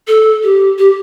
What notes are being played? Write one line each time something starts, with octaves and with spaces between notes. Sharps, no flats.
A4
G4
G4